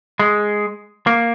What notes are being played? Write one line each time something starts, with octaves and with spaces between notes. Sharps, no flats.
G#3
A#3